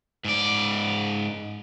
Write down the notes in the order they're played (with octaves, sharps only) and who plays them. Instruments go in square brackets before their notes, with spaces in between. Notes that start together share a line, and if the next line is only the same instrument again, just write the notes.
[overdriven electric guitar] G#2 D5